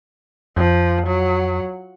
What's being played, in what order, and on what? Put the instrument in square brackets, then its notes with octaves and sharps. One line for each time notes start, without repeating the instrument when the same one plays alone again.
[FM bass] F2 [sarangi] F3
[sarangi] F#3